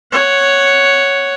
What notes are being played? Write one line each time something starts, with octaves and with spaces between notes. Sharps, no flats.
C#5 F#5